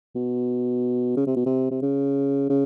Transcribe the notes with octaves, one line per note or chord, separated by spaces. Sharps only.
B2
C#3
C3
B2
C3
C3
C#3
C#3